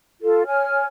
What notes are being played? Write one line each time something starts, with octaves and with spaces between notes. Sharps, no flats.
F4 A4
C#5 G#5 F6